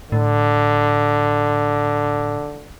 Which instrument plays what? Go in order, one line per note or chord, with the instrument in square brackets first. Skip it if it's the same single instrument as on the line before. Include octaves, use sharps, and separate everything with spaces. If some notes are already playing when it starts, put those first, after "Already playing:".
[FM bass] A2 [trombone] D3